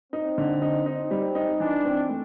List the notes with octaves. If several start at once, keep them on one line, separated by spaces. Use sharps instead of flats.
C4 D#4
D3
D#4
D#4
G3
D#4
E3 D4
C4
A3